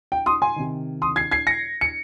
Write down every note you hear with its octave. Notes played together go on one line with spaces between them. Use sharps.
G5
C6 D#6
G#5 C6
C3 D#3
C6 D#6
G#6 C7
G#6 C7
A#6 C#7
C#7